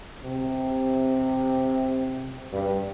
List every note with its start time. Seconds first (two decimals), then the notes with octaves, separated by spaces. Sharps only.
0.25 C3
2.52 G2